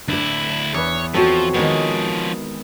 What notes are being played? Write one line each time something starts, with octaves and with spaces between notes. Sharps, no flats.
D2 D4 E4 D5
E2 B4 C#5
F3 C4 F#4 A4 C#5
D#3 F3 G#3 B3 C#5